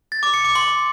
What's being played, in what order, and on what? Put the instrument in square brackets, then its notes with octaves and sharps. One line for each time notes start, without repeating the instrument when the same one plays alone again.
[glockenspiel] A6
D6
C#7
D6
C6